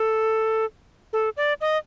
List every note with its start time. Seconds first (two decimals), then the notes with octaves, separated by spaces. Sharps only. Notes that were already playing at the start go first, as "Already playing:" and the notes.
Already playing: A4
1.13 A4
1.37 D5
1.61 D#5